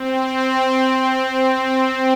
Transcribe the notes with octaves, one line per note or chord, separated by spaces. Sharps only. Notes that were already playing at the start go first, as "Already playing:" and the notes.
Already playing: C4